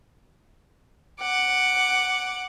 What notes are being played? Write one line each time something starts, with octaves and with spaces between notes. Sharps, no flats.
F#5 D6